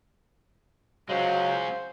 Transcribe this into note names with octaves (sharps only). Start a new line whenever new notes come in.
F#3 G#3 C#4 C5 F5